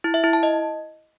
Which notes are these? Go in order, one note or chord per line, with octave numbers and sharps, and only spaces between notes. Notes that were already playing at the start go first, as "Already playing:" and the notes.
E4
E5
E4
A5
D#5